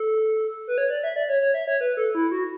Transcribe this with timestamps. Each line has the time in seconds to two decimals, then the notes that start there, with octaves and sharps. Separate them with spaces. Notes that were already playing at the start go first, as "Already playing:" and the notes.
Already playing: A4
0.67 B4
0.78 C#5
0.90 D5
1.03 E5
1.16 D5
1.29 C#5
1.41 C#5
1.54 E5
1.67 C#5
1.81 B4
1.97 A4
2.15 E4
2.31 F#4